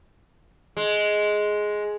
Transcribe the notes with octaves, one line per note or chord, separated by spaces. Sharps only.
G#3